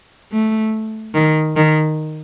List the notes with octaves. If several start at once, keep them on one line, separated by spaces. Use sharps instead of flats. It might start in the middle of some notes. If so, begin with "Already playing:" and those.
A3
D#3
D#3